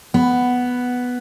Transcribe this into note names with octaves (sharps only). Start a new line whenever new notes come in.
B3